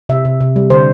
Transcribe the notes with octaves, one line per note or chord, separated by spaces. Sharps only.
C3 E5
C3
C3
G3
D3 C5